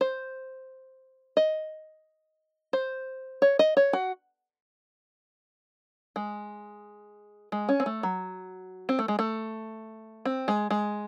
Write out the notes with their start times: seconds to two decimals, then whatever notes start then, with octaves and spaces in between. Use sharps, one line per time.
0.01 C5
1.37 D#5
2.73 C5
3.42 C#5
3.59 D#5
3.77 C#5
3.93 F#4
6.16 G#3
7.52 G#3
7.69 C#4
7.80 C4
7.86 A3
8.03 F#3
8.89 C4
8.99 A3
9.08 G#3
9.19 A3
10.25 C4
10.48 G#3
10.70 G#3